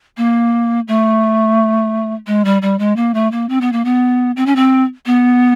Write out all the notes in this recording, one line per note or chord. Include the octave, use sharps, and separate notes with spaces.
A#3
A3
G#3
G3
G3
G#3
A#3
A3
A#3
C4
B3
A#3
B3
C4
C#4
C4
B3